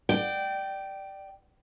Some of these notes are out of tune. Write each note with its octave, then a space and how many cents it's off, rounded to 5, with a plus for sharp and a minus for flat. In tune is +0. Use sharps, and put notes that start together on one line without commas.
D5 +20 G5 -15